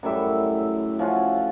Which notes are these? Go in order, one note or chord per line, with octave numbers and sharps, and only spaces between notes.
F#2 A2 G3 E5
F3 C#4 F4 F#4